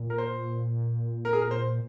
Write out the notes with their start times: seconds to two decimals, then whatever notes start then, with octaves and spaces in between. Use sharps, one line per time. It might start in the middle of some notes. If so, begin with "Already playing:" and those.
Already playing: A#2
0.10 A#4
0.18 C5
1.25 A#4
1.33 G#4
1.42 A#4
1.51 C5